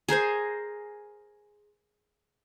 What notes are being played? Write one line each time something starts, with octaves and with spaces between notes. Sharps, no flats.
G#4 A#4 C5 G#5